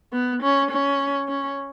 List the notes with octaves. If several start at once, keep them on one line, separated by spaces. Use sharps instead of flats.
B3
C#4
C#4
C#4